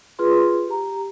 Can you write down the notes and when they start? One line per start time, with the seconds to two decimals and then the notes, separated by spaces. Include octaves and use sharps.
0.19 F4 G#4 B4 C6
0.67 G4 A#5